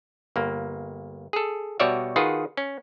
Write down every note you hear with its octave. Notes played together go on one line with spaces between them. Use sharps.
G1 A#3
G#4 A4
B2 G3 F#4 C#5 D5 E5
D#3 F4 F#4 G#4 B4
C#4